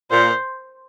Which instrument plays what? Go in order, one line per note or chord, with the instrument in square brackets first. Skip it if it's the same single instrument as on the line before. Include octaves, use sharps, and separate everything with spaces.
[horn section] A#2 [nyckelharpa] C5